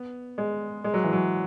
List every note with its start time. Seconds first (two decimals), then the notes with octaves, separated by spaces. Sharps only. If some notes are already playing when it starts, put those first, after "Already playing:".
Already playing: B3
0.38 G#3
0.84 G#3
0.94 F#3
1.04 E3
1.13 F#3